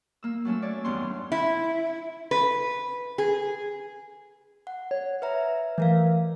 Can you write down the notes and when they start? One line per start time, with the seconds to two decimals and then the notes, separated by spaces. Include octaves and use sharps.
0.23 A#3 E6
0.45 F#3 A3 C#4 E6
0.62 C#5 D5
0.84 E2 G2 D#3 B3 C#4 C6
1.32 E4
2.31 B4
3.18 G#4
4.67 F#5
4.91 C#5
5.22 B4 E5 A#5
5.78 E3 A3 A#4 F5